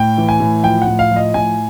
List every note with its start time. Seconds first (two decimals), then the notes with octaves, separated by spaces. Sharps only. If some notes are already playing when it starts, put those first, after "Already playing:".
Already playing: A2 G5
0.18 E3
0.29 G#5
0.40 A2
0.63 F3 G5
0.82 F#5
0.87 A2
0.99 F5
1.11 F3
1.16 D#5
1.34 A2 G#5